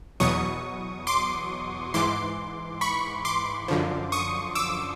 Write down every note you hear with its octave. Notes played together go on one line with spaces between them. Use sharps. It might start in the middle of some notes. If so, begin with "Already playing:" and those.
E2 B2 F#3 C#6 D#6
C6 D6
G#2 E3 C6 D6
B5 C#6
C6 D6
F#2 D3 F3
C#6 D#6
D6 E6